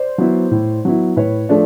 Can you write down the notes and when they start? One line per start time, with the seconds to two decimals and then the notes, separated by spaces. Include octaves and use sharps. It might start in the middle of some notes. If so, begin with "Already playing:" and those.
Already playing: C5 D5
0.18 F#3 B3 E4
0.51 A2
0.85 F#3 B3 E4
1.16 A2 B4 C#5
1.49 F3 A3 D4